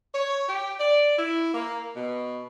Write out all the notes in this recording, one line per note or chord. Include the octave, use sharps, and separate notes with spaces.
C#5
G4
D5
E4
A#3
B2